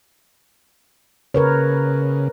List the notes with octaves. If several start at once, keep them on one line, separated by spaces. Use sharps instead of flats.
C#3 A#4 B4 C#5